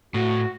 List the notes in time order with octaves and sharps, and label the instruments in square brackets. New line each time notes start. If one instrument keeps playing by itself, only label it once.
[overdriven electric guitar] A2 [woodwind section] F#4